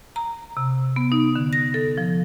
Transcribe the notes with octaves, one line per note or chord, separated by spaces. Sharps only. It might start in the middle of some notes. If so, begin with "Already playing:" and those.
A#5
C3
B3
D#4
D3
A#6
A4
F3